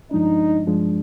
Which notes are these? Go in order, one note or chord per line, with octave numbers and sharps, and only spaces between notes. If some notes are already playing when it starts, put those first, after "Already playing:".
G2 F3 G#3 D4 D#4
G2 F3 G#3 D4